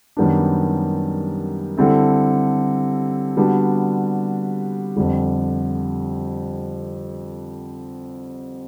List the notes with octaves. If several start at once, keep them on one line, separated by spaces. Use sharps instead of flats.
F#2 D#3 G3 B3 D4
D3 G3 C4 E4 A4
D3 G3 B3 D4 F#4
F2 D3 G3